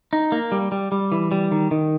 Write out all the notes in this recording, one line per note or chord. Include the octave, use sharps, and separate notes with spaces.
D#4
A#3
G3
G3
G3
E3
G3
D#3
D#3